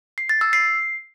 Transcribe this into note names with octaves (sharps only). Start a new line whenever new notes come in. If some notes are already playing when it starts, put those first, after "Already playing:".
C7
A6
E6
C7